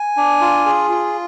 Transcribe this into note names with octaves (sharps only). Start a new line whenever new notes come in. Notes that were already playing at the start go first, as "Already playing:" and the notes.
Already playing: G#5
D4
F4
G#4
F4